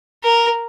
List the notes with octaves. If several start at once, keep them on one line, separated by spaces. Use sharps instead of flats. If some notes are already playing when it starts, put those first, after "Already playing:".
A#4